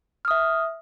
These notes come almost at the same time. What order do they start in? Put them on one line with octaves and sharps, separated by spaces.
F6 D#6 E5